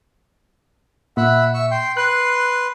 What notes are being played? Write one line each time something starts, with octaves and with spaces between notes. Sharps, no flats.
A#2 E5 F#5 B5
E5 C#6 E6
G5 C6
B4 C6 F#6